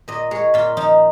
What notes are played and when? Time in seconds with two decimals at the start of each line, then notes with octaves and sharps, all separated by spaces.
0.08 A#2 D#5
0.31 G#3 C#5
0.54 A#2 F4
0.77 F3 D#4